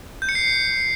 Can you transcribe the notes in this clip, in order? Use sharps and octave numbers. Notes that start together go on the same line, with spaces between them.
G6
C#7
C7